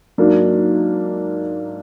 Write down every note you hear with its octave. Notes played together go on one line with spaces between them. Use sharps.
G#2 F#3 A#3 D4